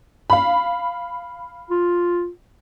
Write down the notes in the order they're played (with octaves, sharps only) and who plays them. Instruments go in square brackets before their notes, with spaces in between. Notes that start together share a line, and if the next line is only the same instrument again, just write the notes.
[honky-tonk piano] F5 B5
[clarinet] F4